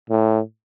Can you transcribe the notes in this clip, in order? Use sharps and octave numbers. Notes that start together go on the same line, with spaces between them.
A2